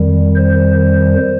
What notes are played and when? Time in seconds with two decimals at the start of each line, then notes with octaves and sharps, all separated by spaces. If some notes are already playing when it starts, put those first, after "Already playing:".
Already playing: F2 D#3 G3
0.36 C5